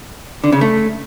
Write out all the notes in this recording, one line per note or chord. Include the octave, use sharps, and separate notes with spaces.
D3
C#3
A3